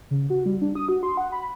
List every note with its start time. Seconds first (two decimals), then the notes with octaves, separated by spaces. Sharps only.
0.11 C#3
0.30 F#4
0.46 G3
0.62 D4
0.75 D#6
0.89 F#4
1.03 C6
1.17 F#5
1.32 B5